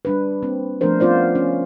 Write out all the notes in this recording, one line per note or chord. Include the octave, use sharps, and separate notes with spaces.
G3 D4 B4
A#3 C4
F3 A3 B3 D4 A#4 C5
B3 C#4 F4 C5 D5
C#4